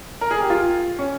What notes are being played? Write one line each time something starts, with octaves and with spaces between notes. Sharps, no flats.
A#4
G#4
G4
F4
C#4